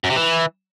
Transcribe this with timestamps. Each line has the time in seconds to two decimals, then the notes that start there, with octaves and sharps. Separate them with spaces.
0.04 F#2
0.10 C3
0.16 E3